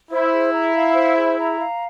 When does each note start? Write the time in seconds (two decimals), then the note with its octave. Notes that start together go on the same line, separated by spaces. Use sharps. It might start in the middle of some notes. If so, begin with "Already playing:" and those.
0.11 E4 C5
0.32 G#4
0.53 A#5
0.74 F5
0.95 C5
1.17 G#4
1.38 A#5
1.59 F5